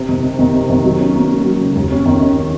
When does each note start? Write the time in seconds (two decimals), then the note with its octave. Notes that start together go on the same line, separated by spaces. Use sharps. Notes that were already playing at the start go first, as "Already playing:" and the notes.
Already playing: C3
0.09 D#3
0.23 C3
0.39 D#3
0.55 C3
0.70 D#3
0.84 F#3
0.99 C#4
1.15 A#3
1.30 F#3
1.44 F#3
1.60 C#3
1.75 D#2
1.91 C#4
2.06 D#3
2.21 C#4
2.36 C#4